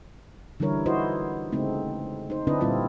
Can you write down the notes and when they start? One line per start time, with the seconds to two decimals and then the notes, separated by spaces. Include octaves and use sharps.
0.60 D3 E3 G3 E4 A#4 C#5
0.86 D#4 E4 F#4 B4 C5 D#5
1.52 C#3 G#3 A3 C4 D#4
2.30 D#4 C5
2.47 D3 C4 D4 E4 B4 D#5
2.61 A#2 G3 C4 E4 F4